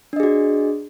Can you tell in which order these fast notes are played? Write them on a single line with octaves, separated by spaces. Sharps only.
D4 D#5 G#4 F#4